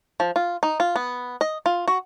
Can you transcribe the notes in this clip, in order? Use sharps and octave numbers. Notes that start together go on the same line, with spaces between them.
F3
F4
D#4
F4
B3
D#5
F4
F#4